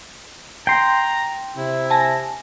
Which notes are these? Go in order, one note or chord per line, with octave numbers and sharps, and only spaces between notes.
G5 A#5 C6
C3 E4
G#5 A5 A#6